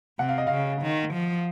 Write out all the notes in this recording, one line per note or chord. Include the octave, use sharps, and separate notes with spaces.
C3 F#5
F5
D#5
C#3 F5
D#3
F3